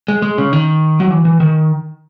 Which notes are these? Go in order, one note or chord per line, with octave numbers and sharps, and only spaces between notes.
G#3
G#3
C#3
D#3
F#3
E3
E3
D#3